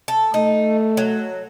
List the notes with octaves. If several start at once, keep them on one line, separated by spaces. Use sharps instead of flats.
A4
A3 D#4
F#3